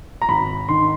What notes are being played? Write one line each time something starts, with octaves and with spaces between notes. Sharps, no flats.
A#5
G#1 B5
D#3 C6